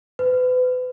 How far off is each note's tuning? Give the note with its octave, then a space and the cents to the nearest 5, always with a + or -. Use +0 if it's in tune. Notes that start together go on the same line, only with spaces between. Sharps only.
B4 +35